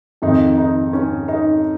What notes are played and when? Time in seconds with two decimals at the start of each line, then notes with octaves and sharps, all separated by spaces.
0.22 F2 D#3 D#4
0.58 D#4
0.93 C#4
1.28 D#4